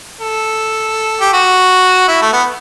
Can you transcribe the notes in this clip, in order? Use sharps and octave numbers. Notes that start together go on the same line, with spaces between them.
A4
G4
F#4
E4
A3
B3